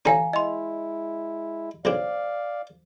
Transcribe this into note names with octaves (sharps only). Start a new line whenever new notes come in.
A1 D3 C#4 F5 G#5 A#5
G#3 E4 D#5 C6
B1 C#3 D4 C5 D5 F5